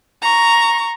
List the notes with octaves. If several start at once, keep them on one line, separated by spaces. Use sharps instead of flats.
A#5 C#6